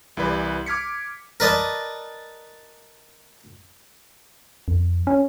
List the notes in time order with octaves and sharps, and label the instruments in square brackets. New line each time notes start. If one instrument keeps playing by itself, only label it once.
[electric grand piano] C2 E3 G3 B4 D5
D6 F6 G#6 B6 C#7
[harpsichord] A#4 B4 D5 D#5 A5
[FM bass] F2
C#4